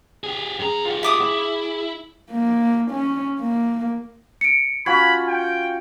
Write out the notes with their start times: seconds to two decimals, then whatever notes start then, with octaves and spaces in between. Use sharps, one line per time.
0.24 G4 G#4
0.59 F#2 G#4 A#5
0.85 F4 G4
1.03 E5 D6 D#6
1.21 E4
2.31 A#3
2.92 C#4
3.41 A#3
4.41 C#7 D7
4.86 C#4 F4 F#4 B5 G#6
5.28 G5